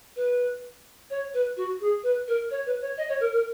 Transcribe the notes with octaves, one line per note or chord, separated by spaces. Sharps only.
B4
C#5
B4
F#4
G#4
B4
A#4
C#5
B4
C#5
D#5
C#5
A#4
A#4